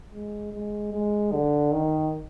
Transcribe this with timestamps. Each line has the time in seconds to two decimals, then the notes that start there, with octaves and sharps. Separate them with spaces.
0.12 G#3
0.53 G#3
0.92 G#3
1.32 D3
1.72 D#3